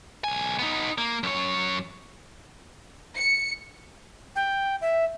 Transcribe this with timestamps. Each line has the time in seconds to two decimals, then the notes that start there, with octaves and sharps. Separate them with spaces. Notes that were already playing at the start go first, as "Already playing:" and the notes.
0.24 B1 G#5
0.59 B3 D#4
0.98 A#3
1.23 F#2 C#5
3.17 C#7
4.36 G5
4.81 E5